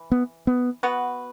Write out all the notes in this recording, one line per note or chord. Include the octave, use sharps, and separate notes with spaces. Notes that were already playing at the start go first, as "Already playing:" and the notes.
Already playing: E3
B3
B3
B3 F#4 B4